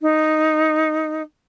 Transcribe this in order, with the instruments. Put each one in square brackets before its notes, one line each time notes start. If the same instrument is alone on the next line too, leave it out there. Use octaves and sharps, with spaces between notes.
[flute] D#4